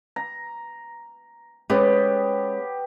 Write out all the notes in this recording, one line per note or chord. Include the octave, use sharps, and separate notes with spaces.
A#5
G#3 B3 C#4 G4